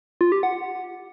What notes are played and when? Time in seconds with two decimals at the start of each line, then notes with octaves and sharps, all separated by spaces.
0.21 F4
0.32 G4
0.43 F#5